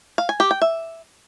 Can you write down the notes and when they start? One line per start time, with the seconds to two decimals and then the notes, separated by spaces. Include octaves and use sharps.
0.18 F5
0.29 G#5
0.40 G4
0.51 G5
0.62 E5